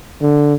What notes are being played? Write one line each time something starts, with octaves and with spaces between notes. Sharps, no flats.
D3